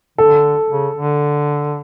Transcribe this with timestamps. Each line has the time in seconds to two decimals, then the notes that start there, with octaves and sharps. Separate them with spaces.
0.18 D3 A4
0.70 C#3
0.97 D3